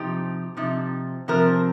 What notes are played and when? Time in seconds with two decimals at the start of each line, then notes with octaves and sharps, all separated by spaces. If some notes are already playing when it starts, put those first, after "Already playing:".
Already playing: C3 F3 D#4 G4
0.57 C3 F3 D#4
1.28 C3 F3 C4 A#4